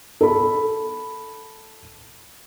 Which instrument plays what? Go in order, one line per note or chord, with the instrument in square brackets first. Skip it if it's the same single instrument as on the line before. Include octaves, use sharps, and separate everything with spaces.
[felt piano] A4 B5